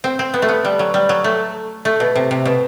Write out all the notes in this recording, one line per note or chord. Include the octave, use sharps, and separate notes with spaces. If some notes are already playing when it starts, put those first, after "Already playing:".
C4
C4
B3
A3
B3
G3
F#3
G3
F#3
A3
A3
B2
C3
C3
B2